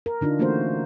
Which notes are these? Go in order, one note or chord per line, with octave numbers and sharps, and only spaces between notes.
A#4
D3 D4 D#4 F4
E3 A3 A#3 C#4 F#4 C5